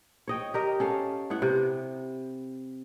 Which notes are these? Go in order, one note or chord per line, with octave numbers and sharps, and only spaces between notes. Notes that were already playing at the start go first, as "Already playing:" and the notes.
C#5 D#5 G5
G4 A#4 D#5
C#4 A4 F5
B3 E4 F#5
C3